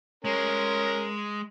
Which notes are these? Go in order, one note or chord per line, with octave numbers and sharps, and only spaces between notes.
G#3 C#4 A#4